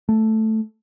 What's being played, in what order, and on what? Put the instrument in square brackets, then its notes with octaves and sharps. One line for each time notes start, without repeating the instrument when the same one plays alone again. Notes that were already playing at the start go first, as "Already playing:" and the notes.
[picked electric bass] A3